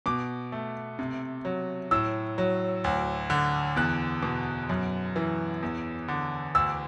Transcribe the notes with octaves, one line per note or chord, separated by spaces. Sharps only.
B2 D6
A3
C3
F#3
A2 E6
F#3
D2
D3
E2 F#6
B2
F#2
E3
E2
D3
D2 E6